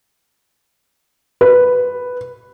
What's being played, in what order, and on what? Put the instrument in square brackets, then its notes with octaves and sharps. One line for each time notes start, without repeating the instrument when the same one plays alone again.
[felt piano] B4